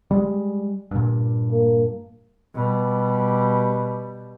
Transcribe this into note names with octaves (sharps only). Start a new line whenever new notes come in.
G3 G#3
G2 A#2
A#3
B2 G3